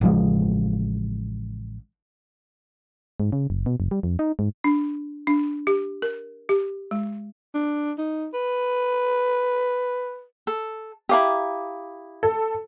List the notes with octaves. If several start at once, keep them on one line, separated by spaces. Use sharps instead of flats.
A1 C#3 F3 G#3
G#2
C#3
F#1
B2
F#1
G3
F2
D#4
G#2
D4
D4
G4
A#4
G4
G#3
D4
D#4
B4
A4
E4 G4 F5 A#5 D6 D#6
A4